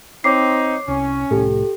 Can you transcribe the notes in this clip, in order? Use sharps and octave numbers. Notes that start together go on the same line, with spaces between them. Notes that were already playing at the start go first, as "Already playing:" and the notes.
C4 D#4 C#5 D6 C7
C2 C#4
C2 A2 G4 A4